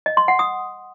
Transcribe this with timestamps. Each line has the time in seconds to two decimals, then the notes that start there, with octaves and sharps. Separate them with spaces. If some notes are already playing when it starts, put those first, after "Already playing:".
0.06 D#5
0.17 C6
0.28 F#5
0.39 D#6